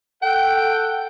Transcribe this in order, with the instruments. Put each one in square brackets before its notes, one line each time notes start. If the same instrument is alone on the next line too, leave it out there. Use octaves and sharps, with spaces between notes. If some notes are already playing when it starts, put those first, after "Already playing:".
[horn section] A4 F#5 [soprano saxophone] G5